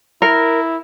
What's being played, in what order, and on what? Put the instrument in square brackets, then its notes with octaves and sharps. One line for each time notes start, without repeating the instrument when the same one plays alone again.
[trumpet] E4 [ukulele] A#4